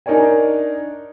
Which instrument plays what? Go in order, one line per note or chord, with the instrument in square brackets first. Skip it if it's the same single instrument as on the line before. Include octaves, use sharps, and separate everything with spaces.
[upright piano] D4 D#4 A#4 C#5 D5 G#5